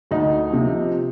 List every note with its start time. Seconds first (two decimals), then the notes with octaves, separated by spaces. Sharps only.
0.11 D2 D#4
0.50 C3 F3